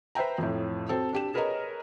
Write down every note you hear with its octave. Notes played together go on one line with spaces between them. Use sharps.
B4 C5 E5 G5 A#5
F2 A2
F#3 C4 A4
D4 G4 E7
G#4 A#4 B4 C#5 D#5 A#5